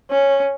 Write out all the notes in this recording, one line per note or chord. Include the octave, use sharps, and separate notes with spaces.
C#4